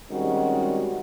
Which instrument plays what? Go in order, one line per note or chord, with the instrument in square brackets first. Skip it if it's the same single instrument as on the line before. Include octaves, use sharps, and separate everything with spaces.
[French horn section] D#3 G3 G#3 C4 C#4 F#4